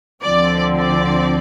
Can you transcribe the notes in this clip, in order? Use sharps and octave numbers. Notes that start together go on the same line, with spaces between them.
D2 D3 F3 C4 D5
D5